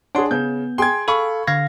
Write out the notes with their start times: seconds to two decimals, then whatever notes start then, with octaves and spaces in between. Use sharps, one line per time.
0.15 D4 G#4 C#5 F#5 C6
0.31 C#3 B3 G6
0.78 G#4 G5 G#5 C6 G#6
1.08 A4 F5 B5 C#6
1.47 D3 F5 G#6 A#6